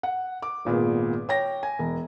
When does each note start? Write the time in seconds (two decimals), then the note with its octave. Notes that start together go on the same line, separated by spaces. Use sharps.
0.03 F#5
0.42 D6
0.65 G#1 A#2 B3 G#4
1.29 C#5 G5 A#6
1.63 G#5
1.79 E1